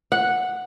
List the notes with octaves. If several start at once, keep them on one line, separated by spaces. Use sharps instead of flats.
F#5